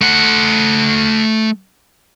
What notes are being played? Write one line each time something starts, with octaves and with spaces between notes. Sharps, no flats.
A3 F#5